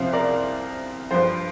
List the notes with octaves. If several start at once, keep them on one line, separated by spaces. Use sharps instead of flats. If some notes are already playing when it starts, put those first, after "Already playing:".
Already playing: C2 C3 F3 C5 F5
A#4 D5
G2 F3 C5